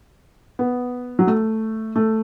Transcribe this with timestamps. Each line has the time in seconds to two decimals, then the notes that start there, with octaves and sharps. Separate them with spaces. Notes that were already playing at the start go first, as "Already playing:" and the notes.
0.59 B3
1.19 F#3
1.27 A3
1.96 A3